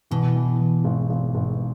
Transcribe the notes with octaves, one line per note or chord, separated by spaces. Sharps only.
B2 E3
E3
E3
G#1
G#1
G#1